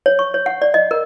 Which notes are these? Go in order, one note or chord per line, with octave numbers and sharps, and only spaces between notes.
C#5
C#6
C#5
F#5
D5
D#5
A#4